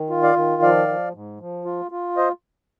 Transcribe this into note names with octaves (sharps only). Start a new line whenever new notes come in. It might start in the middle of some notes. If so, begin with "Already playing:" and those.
Already playing: D#3
F4
D5 F5
D#3
F3 D5 F5
F3
G#2
F3
F4
F4
C5 D#5